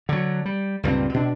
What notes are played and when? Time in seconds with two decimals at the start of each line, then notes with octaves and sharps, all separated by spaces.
0.09 D3 F#3
0.45 G3
0.83 C#2 G2 A#2 C4
1.14 B2 D4